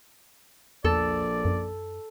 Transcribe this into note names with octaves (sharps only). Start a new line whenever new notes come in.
A#1 E2 A4 D5
F#2